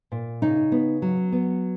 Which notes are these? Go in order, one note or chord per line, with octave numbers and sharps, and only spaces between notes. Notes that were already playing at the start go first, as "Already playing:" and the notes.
A#2
C#3 D#4
B3
F#3
B3